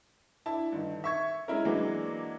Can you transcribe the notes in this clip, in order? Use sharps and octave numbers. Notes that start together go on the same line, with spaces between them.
D4 E4 A5
G2 D3 D#3
E5 C#6 G#6
G#3 C#4 E4 A#4
E3 F#3 G#3 A#3 D4